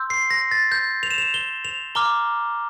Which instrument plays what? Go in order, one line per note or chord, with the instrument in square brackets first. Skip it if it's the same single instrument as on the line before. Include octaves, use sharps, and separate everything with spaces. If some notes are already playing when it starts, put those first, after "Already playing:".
Already playing: [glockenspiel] C6 E6 G6
C7
A#6
A6
G6
F7
E7
F7
G7
F7
A#5 D6 F6 G7